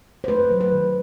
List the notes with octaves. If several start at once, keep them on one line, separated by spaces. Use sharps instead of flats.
C5
A3 B4
F#3
B4
D#3